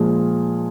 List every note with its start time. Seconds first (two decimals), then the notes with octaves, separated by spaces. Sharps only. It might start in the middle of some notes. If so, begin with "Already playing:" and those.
Already playing: A#2 F3 G#3